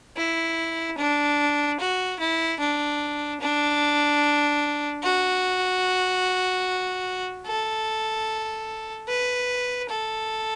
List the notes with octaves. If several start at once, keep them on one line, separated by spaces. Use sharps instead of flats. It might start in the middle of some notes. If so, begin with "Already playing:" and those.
E4
D4
F#4
E4
D4
D4
F#4
A4
B4
A4